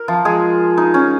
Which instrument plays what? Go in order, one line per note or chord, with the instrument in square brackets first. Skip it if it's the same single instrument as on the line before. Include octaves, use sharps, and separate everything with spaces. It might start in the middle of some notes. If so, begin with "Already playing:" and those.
Already playing: [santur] A#4
F3 F4
G#3 G#4
D#4
C#4